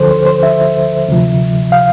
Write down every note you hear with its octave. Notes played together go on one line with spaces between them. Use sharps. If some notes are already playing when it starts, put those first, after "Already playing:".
Already playing: D2 D3 F3 A4 C5
C5
C5
E5
D2 C3 F3
F5